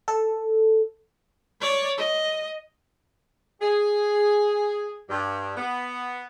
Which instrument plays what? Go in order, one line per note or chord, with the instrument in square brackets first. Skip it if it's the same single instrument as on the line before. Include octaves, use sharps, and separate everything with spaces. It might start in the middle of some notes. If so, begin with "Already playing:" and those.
[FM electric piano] A4
[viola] C#5 D5
D#5
[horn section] G#4
G2
B3